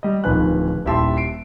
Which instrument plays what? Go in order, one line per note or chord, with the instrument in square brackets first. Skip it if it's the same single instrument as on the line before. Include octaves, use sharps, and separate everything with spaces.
[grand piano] G3 D#5
D1 D#3 F3 B4 G#5 F#6
D#1 E4 G4 E5 A5 C6
C7 D7